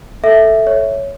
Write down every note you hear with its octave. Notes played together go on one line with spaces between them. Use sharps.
A4 E5
C#5